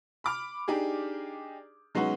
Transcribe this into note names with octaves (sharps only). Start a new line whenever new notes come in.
B5 D6 F6
D4 D#4 G4 G#4
F#3 G#3 B3 C#4 D#4 F#4